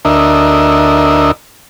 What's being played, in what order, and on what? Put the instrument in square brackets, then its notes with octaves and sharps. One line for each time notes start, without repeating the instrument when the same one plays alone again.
[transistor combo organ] D2 D4 A#4 D#5 E5